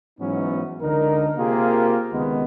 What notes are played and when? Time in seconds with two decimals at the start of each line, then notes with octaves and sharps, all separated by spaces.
0.20 G#2 E3 F#3 B3 C#4 D#4
0.82 C#2 D3 D#4 A#4
1.37 C3 A#3 F4 G4 G#4 A#4
2.12 C#2 C3 D#3 G#3 B3